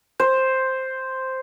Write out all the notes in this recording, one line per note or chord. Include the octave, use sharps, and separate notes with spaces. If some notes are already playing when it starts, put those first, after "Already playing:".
C5